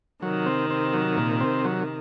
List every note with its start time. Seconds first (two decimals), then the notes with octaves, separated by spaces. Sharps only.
0.22 C3 D#3 F#3
0.46 C4
0.70 C4
0.93 F#3
1.17 A#2
1.40 C4
1.64 F#3